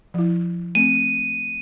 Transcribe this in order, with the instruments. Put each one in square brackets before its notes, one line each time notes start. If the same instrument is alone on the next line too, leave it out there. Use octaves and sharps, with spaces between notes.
[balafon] F3 E4
[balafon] A3 C4 [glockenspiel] D#7